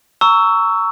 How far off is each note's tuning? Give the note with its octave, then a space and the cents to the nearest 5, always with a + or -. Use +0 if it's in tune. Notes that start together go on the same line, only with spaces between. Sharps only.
A#5 -20 C#6 +20 E6 +0